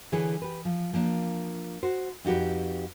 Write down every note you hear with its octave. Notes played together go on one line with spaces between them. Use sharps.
D3 E3 E4 G#4 B4 C#5
G4 B4
F3
F3 A#3 D4
F#4 C5
F2 D#4 F#4 G4 B4